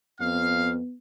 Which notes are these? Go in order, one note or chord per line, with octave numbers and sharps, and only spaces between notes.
F2 B3 F5